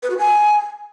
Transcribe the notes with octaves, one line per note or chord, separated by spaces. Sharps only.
B4
F#4
G#5